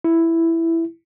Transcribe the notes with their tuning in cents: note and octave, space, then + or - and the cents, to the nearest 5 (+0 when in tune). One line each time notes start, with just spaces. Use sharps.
E4 +5